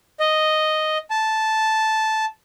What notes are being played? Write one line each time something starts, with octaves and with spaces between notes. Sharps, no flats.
D#5
A5